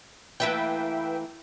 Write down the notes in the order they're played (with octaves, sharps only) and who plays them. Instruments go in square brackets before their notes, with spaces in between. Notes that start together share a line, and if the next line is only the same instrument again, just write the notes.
[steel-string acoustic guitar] E3 A3 A#3 [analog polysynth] B4 E5 G5